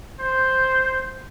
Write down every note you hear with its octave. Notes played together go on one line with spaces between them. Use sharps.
C5